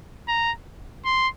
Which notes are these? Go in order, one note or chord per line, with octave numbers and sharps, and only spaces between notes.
A#5
C6